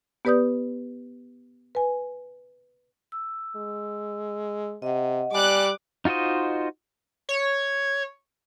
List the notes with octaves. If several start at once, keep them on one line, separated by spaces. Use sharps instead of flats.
B3 G4 B4 D5 D#6 G6
B4 G#5
E6
G#3
C3 D#5 F#5
G3 D5 G#5 D6 F#6
D#4 F4 F#4 C5 D#5
C#5